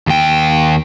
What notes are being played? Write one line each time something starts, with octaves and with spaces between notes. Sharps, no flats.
D#2 G5